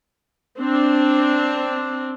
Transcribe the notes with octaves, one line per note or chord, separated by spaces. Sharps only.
C4 D4